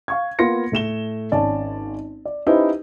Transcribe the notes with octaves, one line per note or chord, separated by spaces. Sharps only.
F5 C#6 G#6
A#3 B3 F4 C6 A#6 C#7
A2 A3 E7 G7
G#1 C#4 D5 A5
D5
C#4 D#4 E4 G4 B4 C5